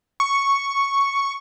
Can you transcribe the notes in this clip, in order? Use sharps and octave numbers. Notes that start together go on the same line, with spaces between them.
C#6